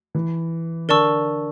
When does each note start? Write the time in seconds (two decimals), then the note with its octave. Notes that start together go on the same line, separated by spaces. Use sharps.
0.15 E3
0.89 D3 A#4 D5 A5 C#6 E6